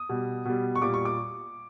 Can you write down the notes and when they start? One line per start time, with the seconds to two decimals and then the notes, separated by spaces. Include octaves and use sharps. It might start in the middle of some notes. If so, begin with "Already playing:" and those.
Already playing: D#6
0.09 B2 G3
0.45 B2 G3
0.75 C#6
0.81 A#2 G3 D6
0.94 C#6
1.05 D6